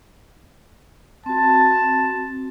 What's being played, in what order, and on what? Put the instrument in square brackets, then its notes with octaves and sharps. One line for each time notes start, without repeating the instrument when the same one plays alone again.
[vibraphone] C4 F#4 [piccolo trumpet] A5